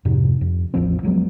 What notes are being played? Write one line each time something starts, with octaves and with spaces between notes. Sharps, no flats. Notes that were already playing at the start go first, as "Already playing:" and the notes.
F2 G#2 C3
F2
A1 E2 F3 C4
F3 F#3 G#3 B3